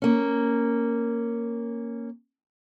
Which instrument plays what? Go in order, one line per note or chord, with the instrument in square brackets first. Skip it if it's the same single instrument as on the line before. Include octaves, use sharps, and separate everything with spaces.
[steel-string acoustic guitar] A#3 C#4